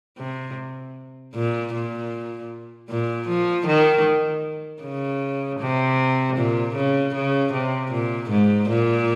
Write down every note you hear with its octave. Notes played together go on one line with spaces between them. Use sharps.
C3
A#2
A#2
A#2
F3
D#3
C#3
C3
A#2
C#3
C#3
C3
A#2
G#2
A#2